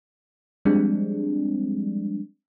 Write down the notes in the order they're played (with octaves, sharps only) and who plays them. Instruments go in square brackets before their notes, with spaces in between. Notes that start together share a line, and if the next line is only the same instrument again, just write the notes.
[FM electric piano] F3 G3 G#3 C4 D4